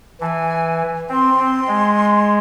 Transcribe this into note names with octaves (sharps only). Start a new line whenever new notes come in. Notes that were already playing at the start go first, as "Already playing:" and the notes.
E3 A5
G#5
C4 C6
C4
G#3